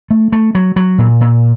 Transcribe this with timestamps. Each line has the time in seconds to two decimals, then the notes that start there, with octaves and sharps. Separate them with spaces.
0.11 A3
0.32 A3
0.55 F#3
0.76 F#3
0.98 A#2
1.21 A#2